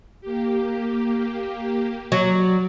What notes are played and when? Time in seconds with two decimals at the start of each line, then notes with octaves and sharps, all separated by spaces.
0.21 A#3 G4
2.12 F#3 D5